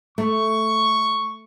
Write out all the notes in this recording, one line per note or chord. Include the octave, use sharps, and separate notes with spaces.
A3 C#6